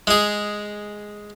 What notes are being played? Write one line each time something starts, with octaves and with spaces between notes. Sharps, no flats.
G#3 G#4